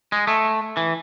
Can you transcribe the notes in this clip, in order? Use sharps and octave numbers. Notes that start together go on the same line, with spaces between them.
G#3
A3
E3